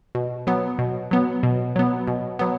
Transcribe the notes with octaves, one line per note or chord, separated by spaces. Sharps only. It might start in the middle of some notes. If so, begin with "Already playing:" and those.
B2
F#3 B3
B2
F#3 B3
B2
F#3 B3
B2
F#3 B3